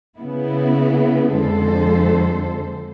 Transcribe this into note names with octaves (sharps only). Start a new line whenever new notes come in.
C#3 B3 E4
F2 D3 G#3 A4 C5